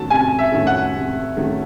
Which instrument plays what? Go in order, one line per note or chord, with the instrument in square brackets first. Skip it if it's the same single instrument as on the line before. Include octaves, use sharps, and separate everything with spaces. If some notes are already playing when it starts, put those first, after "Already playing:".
Already playing: [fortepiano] D#3 A3 C#4 F#4 [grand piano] A5
[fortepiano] C3 [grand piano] G#5
[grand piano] E5
[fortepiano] D#3 A3 C#4 F#4
[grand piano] F#5
[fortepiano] C3
D#3 A3 C#4 F#4